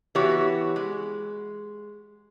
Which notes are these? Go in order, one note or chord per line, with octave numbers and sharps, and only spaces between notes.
E3 B3 F#4 G4 C#5
G#3